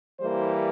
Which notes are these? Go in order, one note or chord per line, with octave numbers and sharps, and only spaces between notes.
E3 G3 A#3 C5